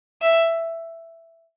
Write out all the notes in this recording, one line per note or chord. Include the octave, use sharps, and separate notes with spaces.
E5